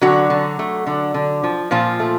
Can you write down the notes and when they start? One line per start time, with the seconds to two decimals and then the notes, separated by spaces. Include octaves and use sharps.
0.01 D3 F#3 F#4
0.30 D3
0.59 A3
0.86 D3
1.14 D3
1.44 F3
1.71 A#2 F3 F4
2.00 A3